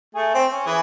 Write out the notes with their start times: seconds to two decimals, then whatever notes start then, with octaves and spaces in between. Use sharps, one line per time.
0.15 A3 G#4
0.34 C4
0.52 C#4
0.66 E3 G#4